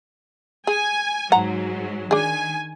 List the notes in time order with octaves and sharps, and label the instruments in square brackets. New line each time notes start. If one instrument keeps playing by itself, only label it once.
[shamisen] G#4 [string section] G#5
[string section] G#2 F#3 [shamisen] F#5 A#5
[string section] D#3 G#5 [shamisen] D4 G#4